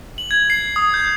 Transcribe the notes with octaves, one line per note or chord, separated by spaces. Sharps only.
F#7
G#6
C7
D#6
G6